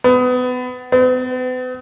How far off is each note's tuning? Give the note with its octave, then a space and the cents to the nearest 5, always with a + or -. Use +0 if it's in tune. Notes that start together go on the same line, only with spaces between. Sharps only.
B3 +25
B3 +45